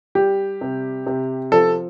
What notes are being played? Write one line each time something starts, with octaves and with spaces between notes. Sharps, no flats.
G3 G4
C3
C3
F3 A4